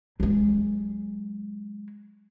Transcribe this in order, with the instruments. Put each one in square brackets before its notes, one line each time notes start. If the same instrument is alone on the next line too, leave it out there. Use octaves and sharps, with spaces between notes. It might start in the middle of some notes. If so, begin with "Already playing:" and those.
[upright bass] F#3 G#3